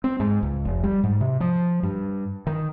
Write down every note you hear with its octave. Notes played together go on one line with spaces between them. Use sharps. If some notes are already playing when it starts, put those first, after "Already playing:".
C4
G#2
C#2
F1
G3
G#2
C3
F3
G2
D#3